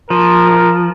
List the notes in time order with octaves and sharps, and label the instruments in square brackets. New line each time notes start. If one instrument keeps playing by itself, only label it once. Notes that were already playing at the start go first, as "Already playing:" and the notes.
[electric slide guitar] F3 [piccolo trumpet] A#4